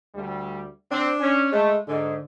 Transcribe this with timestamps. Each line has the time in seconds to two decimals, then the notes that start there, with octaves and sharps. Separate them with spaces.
0.15 D2 G3
0.91 C4 D4
1.21 C#4
1.52 G#3 A3
1.88 G#2 D3